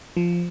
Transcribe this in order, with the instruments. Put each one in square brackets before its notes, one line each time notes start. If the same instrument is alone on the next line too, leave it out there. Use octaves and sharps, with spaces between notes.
[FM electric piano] F3